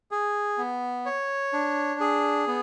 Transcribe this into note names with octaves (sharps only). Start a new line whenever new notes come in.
G#4
B3
C#5
D4
G#4
B3